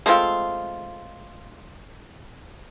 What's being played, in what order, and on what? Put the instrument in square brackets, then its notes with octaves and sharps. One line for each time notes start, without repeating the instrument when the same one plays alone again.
[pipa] G#3 A3 C4 F4